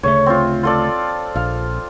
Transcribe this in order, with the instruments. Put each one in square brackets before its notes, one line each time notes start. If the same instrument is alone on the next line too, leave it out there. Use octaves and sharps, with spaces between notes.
[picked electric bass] D2 C#3 A3 [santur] C#5
[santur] C4 F4
F4 A4 D5
[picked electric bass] A#1 [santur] F5